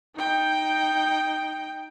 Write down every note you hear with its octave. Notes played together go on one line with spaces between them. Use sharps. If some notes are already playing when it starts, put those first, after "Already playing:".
D#4 G5